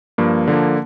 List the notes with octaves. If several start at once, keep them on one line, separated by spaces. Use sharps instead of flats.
G2 F3 A#3
D3 F3 A#3